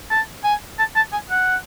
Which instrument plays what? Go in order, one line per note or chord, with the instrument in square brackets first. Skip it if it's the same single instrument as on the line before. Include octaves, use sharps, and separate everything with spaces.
[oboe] A5
G#5
A5
A5
G#5
F#5